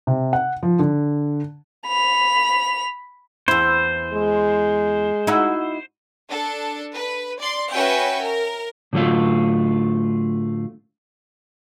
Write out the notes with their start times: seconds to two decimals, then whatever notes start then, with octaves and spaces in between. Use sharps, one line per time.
0.07 C3
0.33 F#5
0.63 F3
0.79 D3
1.88 B5 F7
3.48 E2 E4 C5
4.14 G#3
5.27 D#4 E4 F#4
6.27 D4 A4
6.94 B4
7.39 D5 C6
7.72 C#4 F#4 B4 E5 G5 G#5
8.21 A#4
8.93 A2 D3 F#3 G3 A3 F4